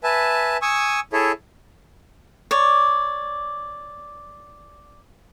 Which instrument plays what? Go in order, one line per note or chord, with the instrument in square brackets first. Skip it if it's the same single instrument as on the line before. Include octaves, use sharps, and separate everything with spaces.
[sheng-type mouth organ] B4 E5 G#5 A5
G#5 C#6 D#6 E6
E4 G#4 A4 C#5 E5
[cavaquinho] C#5 D5